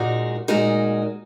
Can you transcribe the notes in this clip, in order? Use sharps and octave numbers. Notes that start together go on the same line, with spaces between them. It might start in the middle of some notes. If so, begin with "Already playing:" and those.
Already playing: A#2 G#3 D#4 F#4 A#4
A#2 G#3 D#4 F#4 A#4